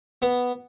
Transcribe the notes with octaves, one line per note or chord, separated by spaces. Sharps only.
B3